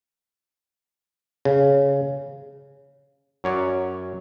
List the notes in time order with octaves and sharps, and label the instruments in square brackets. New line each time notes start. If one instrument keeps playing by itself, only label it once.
[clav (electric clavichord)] C#3
F#2 F#3 C#4 C#5 D5